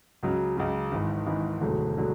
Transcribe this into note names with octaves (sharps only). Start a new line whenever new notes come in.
C#2 C#3 F#3
C#2 C#3 F#3
G#1 G#2 E3
G#1 G#2 E3
E1 D2 D3 F#3 A3
D3 F#3